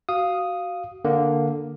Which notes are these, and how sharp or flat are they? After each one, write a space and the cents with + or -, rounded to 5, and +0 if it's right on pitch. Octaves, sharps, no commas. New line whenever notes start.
F#4 +15 F5 +0 D#6 +0
D3 +0 A#3 +0